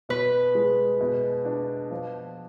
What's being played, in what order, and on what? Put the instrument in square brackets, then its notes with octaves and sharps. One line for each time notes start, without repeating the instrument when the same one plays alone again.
[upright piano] B2 [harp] B4
[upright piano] G#3
B2
D4
F3